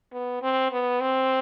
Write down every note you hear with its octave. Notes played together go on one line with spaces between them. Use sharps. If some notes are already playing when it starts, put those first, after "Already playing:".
B3
C4
B3
C4